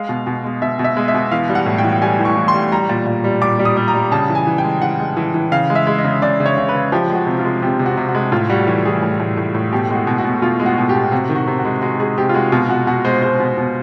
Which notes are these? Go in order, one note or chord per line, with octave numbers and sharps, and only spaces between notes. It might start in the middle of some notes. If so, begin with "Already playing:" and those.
Already playing: G#3 F5
B2
B2
G#3
B2 E5
B2
E5
G#3
E5
B2
E3 F5
G3
F#5
A2
G5
E3
G3 G#5
E3
C#6
E3
C6
G3
G3 A#5
A#2
A#2
G3
A#2 D6
G3
D#6
G3
A#5
G3
C#3 A5
E3
G#5
E3
G5
G#3
E3 F#5
G#3
E3
E3
C#3 F5
G#3
E5
G#3
D#5
C#3
C#3 D5
C#3
C#5
C#3
B4
C#3
F3 G4
G#3 F#4
C3
F4
G#3
C3 G4
C3
F#4
C3
F#4
G#3
A2 F4
G3 F#4
E3
E3 G#4
A2
A2
A2
A2
B2 G4
G#3
F#4
B2
F#4
B2
B2 F4
G#3
F#4
B2
G4
B2
C3 F#4
D#3
F#4
C3
F#4
G#3
G#3 F#4
G#3 G#4
C3 G4
F4
G#3 F#4
B2 F4
B2 F#4
B2 F#4
G#3 C5
G#3 C5
B2
B2